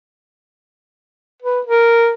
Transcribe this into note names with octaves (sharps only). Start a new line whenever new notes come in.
B4
A#4